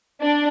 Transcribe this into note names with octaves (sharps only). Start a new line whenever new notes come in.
D4